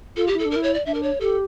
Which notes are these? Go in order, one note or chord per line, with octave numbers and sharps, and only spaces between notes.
F4 A4
G4
E4 A4
D4
E4 A#4
C#5
D5
D4 E5
A#4
C#5
G4 A4